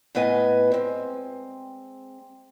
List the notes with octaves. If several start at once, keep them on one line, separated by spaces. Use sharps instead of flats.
A2 B3 B4 D#5 G#5
G#3 C4